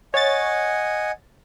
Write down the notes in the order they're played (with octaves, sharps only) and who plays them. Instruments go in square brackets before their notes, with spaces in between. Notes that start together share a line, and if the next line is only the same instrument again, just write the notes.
[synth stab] C#5 A6 [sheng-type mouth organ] D#5 F#5 G#5